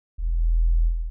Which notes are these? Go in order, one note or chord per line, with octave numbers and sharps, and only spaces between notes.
E1